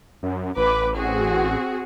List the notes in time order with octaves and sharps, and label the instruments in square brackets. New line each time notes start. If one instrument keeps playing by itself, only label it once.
[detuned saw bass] F#2
[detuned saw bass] A1 [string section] B4 D6
[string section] C4 F#4 G#4